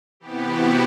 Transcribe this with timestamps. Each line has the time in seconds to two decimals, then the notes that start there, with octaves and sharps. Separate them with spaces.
0.20 C3 E3 B3 G4
0.49 F#4